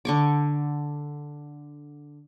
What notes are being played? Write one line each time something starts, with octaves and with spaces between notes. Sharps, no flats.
D3 C#6 D6